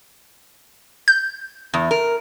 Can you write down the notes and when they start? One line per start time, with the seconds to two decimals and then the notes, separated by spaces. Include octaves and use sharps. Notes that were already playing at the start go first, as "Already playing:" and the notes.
1.08 G6
1.74 E2
1.91 A#4